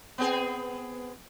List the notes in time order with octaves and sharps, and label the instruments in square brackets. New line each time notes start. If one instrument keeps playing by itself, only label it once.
[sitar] B3 C4 G#4